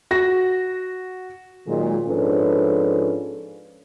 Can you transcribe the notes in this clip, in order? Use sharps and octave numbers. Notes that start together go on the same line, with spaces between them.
F#4 A#6
A#2 D#3 F#3 G#3
G#2 F3 C#4 D4 A4 B4